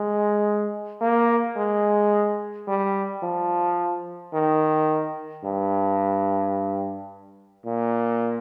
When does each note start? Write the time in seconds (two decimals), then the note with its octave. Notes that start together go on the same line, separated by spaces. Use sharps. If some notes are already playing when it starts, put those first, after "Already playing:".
Already playing: G#3
1.01 A#3
1.56 G#3
2.67 G3
3.22 F3
4.33 D#3
5.44 G2
7.65 A#2